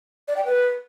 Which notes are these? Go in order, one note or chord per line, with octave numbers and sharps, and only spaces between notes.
D5
G5
B4